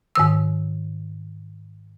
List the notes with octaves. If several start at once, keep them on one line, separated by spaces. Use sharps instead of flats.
G#2 D#3 E6